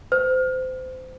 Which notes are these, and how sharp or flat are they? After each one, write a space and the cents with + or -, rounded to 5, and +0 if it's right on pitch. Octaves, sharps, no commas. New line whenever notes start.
C5 -25